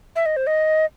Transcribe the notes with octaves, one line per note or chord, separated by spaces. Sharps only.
E5
D#5
C5
D#5